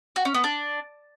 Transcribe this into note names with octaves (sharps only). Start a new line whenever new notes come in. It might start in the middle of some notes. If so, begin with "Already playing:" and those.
F#4
C#4
B3
D4